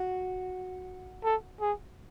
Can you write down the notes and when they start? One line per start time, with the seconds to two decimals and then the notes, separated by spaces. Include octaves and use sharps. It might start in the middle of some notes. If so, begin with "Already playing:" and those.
Already playing: F#4
1.24 A4
1.61 G#4